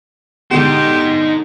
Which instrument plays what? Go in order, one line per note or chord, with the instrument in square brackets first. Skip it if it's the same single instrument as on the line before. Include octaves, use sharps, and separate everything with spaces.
[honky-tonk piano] B2 D3 G#3 [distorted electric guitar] D#4 C5 [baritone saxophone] G4